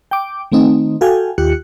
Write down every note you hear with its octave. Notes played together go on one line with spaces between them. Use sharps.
G5 D6
D#3 A3 C4 D#4
F#4 A4 F5 G5 G#5
D#2 F4 G4 F#6 C#7